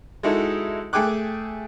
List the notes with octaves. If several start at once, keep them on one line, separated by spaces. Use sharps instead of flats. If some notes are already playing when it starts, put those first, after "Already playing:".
G#3 D#4 E4 F#4 A4
A3 G#4 G5 G#5 D6 F#6